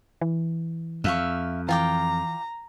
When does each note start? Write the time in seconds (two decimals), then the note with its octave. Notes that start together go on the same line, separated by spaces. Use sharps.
0.21 E3
1.04 F2 E5 F5 C#6
1.69 E3 F4 G5 A#5 D6